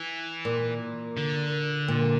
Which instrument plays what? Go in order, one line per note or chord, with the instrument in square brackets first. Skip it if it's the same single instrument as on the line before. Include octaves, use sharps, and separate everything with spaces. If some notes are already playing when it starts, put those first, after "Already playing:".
Already playing: [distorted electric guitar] E3
[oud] A#2
[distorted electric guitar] D3
[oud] A#2